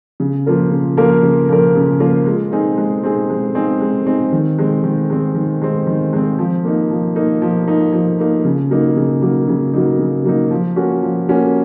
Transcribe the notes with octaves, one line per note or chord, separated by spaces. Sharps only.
C#3
F3 A#3 F4 A#4
C#3
F3 A#3 F4 A#4
C#3
F3 A#3 F4 A#4
C#3
F3 A#3 F4 A#4
G#3
C4 D#4 G#4
G#3
C4 D#4 G#4
G#3
C4 D#4 G#4
G#3
C4 D#4 G#4
D#3
G#3 C4
D#3
G#3 C4
D#3
G#3 C4
D#3
G#3 C4
F3
A#3 D#4
F3
A#3 D#4
F3
A#3 D#4
F3
A#3 D#4
C#3
F#3 A#3 D#4
C#3
F#3 A#3 D#4
C#3
F#3 A#3 D#4
C#3
F#3 A#3 D#4
F3
A#3 C#4 F#4
F3
A#3 C#4 F#4